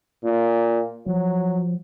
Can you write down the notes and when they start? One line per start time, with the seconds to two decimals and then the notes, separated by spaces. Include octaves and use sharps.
0.24 A#2
1.06 F3 F#3